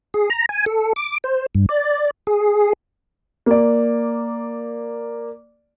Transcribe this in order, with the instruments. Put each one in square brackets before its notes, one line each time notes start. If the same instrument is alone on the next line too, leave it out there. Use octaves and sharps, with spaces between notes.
[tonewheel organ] G#4
A#5
G#5
A4
D6
C5
G2
D5
G#4
[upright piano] A#3 D5